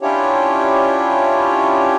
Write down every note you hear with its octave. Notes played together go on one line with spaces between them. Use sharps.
C#4 D4 E4 F4 G4 C#5